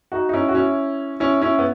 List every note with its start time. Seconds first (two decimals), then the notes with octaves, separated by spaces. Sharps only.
0.12 D#4 F#4
0.29 D#4
0.33 C#4 E4
0.49 F#4
0.55 C#4 E4
1.20 C#4 E4
1.42 C#4 E4
1.59 B3